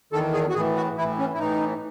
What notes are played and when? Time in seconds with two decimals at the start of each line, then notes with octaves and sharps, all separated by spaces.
0.13 E2 D#3 A4
0.33 G#4
0.49 F#4
0.55 A2 E3 G#4
0.76 F#4
0.97 A2 E3 E4
1.19 C#4
1.34 E4
1.39 A2 E3 D#4